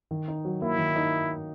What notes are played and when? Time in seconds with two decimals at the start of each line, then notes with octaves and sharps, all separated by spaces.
0.11 D#3
0.28 D#4
0.45 F#3
0.62 A#3 E4
0.78 D#3
0.96 D#4